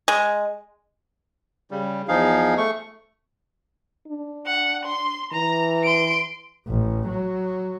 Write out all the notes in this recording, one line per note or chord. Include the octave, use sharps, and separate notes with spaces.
G#3
C#3 G3
E2 F3 D#4 G#4 F5
A3 C#6
D4
F#5
C6
E3 A#5
C6 D7
A1
F#3